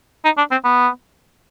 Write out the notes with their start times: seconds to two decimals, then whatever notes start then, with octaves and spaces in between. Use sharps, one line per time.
0.25 D#4
0.38 D4
0.51 C4
0.64 B3